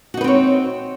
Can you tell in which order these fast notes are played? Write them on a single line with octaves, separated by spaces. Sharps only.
F#4 D#4 B4 C4 C#5